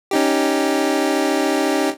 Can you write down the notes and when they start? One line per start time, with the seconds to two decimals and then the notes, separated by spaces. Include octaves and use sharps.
0.11 C#4 D#4 G4